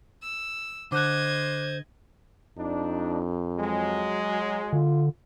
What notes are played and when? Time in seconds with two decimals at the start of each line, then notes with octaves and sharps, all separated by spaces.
0.22 E6
0.92 D3 C5 D#5 D6 F#6 G#6
2.58 F2 D4 D#4
3.59 F#3 G#3
4.73 D3 F4